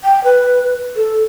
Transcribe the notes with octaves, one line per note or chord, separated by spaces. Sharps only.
G5
B4
A4